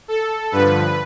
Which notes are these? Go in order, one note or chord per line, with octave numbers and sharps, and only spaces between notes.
A4
G2 D3 F3 B4